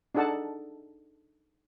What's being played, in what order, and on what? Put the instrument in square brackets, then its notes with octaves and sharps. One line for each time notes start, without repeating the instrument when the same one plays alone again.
[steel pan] D4 D#4 G#4 A4 F#5 A5